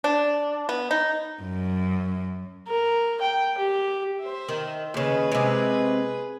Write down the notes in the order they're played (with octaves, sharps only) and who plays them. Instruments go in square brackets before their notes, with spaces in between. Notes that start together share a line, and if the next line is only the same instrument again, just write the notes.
[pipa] D4
B3
D#4
[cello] F#2
[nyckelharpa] A#4
G5
G4
C5 E5
[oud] D#3
[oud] D#2 C#3 [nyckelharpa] G#4 B4
[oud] C3 G#3